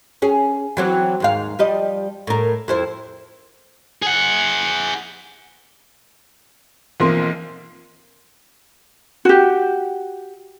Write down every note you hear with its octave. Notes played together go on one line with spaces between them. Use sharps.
C#4 G#4
E3 F#3 C4
D#2 G#2 F5
F3 G3 D#5
A2 A#4
F2 E4 C5
G#4 F#5
B1 E3 F3 A#3 C4 C6
F#4 G4